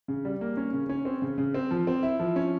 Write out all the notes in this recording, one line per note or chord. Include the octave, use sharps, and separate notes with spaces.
C#3
G3
A#3
C#4
C#3
C#4
C4
C#3
C#3
C4
F3
C4
E4
F3
C#4